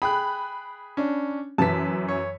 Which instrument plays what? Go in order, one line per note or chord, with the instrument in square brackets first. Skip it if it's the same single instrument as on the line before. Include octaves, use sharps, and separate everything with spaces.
[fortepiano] G#4 G5 [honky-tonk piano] B5 F#6
[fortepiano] C#4 D4
[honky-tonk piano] F#2 E3 B6 [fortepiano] A5
[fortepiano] C#5